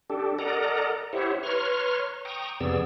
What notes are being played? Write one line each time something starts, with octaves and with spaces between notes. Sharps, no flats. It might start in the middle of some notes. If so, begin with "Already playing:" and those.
D4 G4 A4
A4 A#4 D5 D#5 F#5 A#5
E4 G4 C5 C#5 E5 F#5
B4 C#5 A#5 C6 C#6 F6
G5 A#5 C#6 D#6
F2 C3 B3 G#4 D5 E6